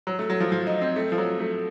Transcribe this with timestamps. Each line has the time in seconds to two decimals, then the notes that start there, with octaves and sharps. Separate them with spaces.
0.07 F#3
0.19 A3
0.30 F#3
0.40 F3
0.52 F3
0.67 D#4
0.82 C4
0.96 A3
1.12 F3
1.18 F#3
1.40 A3